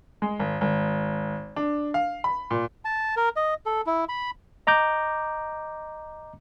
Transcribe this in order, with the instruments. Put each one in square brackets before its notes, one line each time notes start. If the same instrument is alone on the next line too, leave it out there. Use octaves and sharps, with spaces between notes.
[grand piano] G#3
G#1
G#1
D4
F5
B5
A#2
[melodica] A5
A#4
D#5
A4
E4
B5
[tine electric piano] D#5 A#5 D6 G6